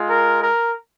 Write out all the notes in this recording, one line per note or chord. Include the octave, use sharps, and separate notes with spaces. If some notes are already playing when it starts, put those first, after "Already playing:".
Already playing: G#3 F4
A#4
A#4